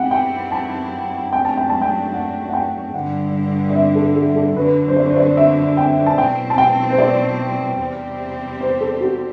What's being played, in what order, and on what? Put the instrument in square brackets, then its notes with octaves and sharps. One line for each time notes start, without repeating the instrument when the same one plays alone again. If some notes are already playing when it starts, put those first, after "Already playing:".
Already playing: [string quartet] F#2 F#3 C4 E4 G4 [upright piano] F#5 G5
[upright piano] G5
A5
[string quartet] F#2 F#3 A3 D4 [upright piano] G5
[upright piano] A5
G5
A5
G5
F#5
F#5
G5
[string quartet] G2 D3 G3 [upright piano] F#5
[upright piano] D5
E5
A4
A4
A4
[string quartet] F#2 D3 F#3 [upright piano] B4
[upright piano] C5
D5
C5
D5
E5
G5
A5
[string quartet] B2 F#3 C4 E4 [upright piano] G5
[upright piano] A5
G5
C5
D5
[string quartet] E2 C3 G3 C4 G4
[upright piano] C5
A4
F#4